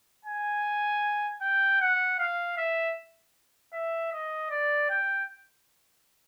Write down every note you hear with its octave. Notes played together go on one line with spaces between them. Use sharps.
G#5
G5
F#5
F5
E5
E5
D#5
D5
G5